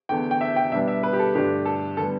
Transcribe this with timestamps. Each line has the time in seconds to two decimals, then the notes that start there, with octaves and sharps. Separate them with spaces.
0.09 E2 D3 A3 G5
0.31 G5
0.41 E5
0.56 G5
0.72 B2 G3 B3 D4 E5
0.88 E5
1.03 B4
1.13 G4
1.19 A4
1.35 G2 D3 A3 D4 G4
1.65 A4
1.97 D3 G3 B3 A4